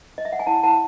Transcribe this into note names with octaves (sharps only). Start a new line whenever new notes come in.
D#5
E5
F#5
G#5
E4 F#5 A5
E4 F#5 A5